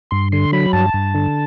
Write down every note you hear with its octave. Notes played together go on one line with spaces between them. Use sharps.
G2 C6
D3 C6
F#3 B5
G2 A5
G2
D3